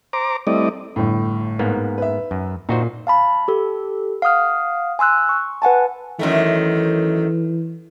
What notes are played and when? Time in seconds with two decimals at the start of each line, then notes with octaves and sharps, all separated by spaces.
0.13 C5 A#5 D6
0.47 G3 A3 C4 E4 D5 D#5
0.96 G1 A2
1.59 G#2 A#3 B3
1.98 B4 E5
2.31 F#2
2.69 A#2 D#4 F#4 C5
3.07 F5 A5 B5
3.48 G4 A4
4.22 F5 F#5 D#6 F6
4.99 G#5 C6 E6 F#6
5.29 C#6
5.62 B4 F#5 G#5 A5
6.19 F#2 D#3 E3 A3